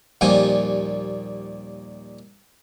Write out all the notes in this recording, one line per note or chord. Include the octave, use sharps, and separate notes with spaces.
D#2 A#2 F3 G3 G5 G#5